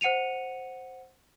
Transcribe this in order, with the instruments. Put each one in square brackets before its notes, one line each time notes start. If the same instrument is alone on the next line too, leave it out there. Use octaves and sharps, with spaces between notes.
[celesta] C5 F#5 C#7 D#7 F7